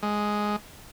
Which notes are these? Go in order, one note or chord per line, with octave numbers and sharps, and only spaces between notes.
G#3